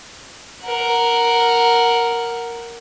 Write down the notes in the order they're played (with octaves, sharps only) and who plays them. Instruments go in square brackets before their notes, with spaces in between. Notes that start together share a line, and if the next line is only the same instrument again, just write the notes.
[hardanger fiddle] A#4 F#5